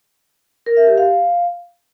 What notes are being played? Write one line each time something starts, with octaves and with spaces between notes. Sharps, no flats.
A#4
E5
G4
F5